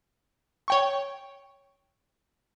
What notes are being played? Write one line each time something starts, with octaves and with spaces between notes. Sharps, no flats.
C#5 G5 C#6